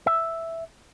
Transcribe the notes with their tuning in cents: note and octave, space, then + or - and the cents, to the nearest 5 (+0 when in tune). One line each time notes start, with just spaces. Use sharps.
E5 +0